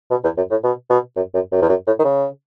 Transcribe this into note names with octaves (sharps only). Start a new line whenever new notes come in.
B2
E2
F#2
A2
B2
B2
F#2
F#2
F#2
E2
F#2
A2
D#3
C#3